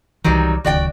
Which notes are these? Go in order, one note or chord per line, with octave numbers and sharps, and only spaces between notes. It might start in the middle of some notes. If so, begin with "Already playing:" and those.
C2 D#3 E3 F#3 G3
D1 C#2 D#3 F#4 D5 G5